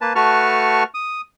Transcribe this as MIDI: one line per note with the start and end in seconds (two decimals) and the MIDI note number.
0.01 0.13 58
0.01 0.13 71
0.01 0.13 81
0.15 0.84 57
0.15 0.84 66
0.15 0.84 71
0.15 0.84 81
0.15 0.84 85
0.15 0.84 89
0.94 1.21 87